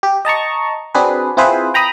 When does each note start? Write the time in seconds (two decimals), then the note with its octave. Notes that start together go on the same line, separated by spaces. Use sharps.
0.03 G4
0.25 D#5 A5 A#5 C#6
0.95 C4 D4 F#4 G#4 B4
1.37 C4 E4 F4 G#4 B4 C5
1.74 G5 A#5 B5 D#6